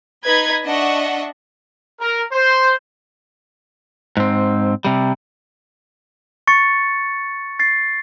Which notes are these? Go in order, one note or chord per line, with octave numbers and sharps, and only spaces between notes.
D#4 B4 D#5 B5 G#6
D4 D#5 E5 F#5 C#6
A#4
C5
G#2 C4
C3 G3
C#6 A6 C#7
A6 C7